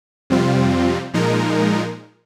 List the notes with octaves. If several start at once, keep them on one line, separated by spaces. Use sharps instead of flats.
F2 C3 G3 C4 F4
A#2 F3 G#3 D#4 A#4